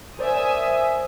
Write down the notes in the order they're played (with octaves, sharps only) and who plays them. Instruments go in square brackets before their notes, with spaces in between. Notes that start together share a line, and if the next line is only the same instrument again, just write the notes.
[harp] A#4 C5 D5 [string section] E5 G#5 D#6